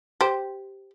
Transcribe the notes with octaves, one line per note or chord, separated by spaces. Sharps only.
G4 C5